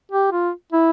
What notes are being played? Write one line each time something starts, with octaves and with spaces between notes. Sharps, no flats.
G4
F4
E4